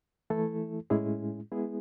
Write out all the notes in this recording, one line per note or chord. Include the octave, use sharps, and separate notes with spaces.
E3 A3 E4 A4
A2 G#3 C#4 E4 G#4
G#3 B3 E4 G#4